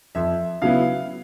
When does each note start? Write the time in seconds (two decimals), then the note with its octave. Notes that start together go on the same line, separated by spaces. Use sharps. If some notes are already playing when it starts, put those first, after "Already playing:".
0.15 F2 E5
0.62 C#3 F#3 B3 E4 F5